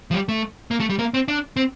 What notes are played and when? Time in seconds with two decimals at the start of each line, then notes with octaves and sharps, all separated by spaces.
0.11 F3
0.14 G3
0.29 A3
0.71 A#3
0.80 A3
0.90 G3
0.99 A#3
1.14 C4
1.28 D4
1.56 C4